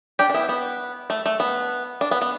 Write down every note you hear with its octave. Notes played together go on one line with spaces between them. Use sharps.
D4 G4
D4
B3 E4
B3
A3
A3
B3
D4
B3
B3